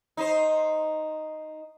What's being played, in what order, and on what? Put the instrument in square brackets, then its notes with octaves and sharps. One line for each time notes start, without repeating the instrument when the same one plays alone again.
[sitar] D#4 C5